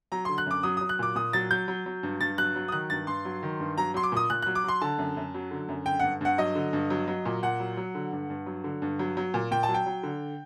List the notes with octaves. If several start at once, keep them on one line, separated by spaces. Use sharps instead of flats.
F#3 A#5
D3 C6
F#6
F#2 D6
F#3 D#6
F#3 D#6
F#6
A#2 D6
A#2 D#6
F#3 A6
F#3 G6
F#3
F#3
G2
G2 A6
F#3 F#6
F#3
D#6
D#3 F#6
G2 A6
G2 C6
F#3
D#3
G2
F#3 A#5
F#3 C6
D6
A#2 D#6
A#2 F#6
F#3 F#6
D6
F#3 C6
D3 A5
F#2
F#2
F#3
D3
F#2
D3 G5
G2 F#5
G2 F#5
F#3 D#5
D3
G2
F#3
F#3
A#2
A#2 F#5
F#3
F#3
D3
G2
G2
F#3
D3
G2
F#3
F#3
A#2
A#2 G5
A5
F#3
G5
F#3
D3